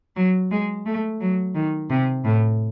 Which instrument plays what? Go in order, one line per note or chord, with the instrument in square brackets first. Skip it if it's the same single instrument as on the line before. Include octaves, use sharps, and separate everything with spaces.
[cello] F#3
G#3
A3
F#3
D#3
C3
A2